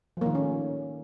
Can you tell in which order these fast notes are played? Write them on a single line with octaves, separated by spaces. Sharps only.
F3 A#3 D#3 A3 C#4